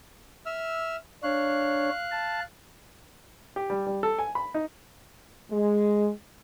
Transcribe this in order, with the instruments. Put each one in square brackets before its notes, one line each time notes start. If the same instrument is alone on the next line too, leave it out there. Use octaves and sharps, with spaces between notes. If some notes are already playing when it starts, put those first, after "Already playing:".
[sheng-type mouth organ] E5 E6 F6
[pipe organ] D4 C#5 [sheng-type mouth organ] F5 F#6
[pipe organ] A5
[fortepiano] G4
G3
G3
A4
G#5
B5
D#4
[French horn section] G#3